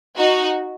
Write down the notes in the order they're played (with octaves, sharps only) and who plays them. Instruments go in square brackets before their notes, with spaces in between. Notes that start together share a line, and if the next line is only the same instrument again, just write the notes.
[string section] D#4 F#4